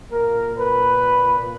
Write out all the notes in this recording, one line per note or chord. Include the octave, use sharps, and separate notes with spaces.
A#2 A#3 A#4
B4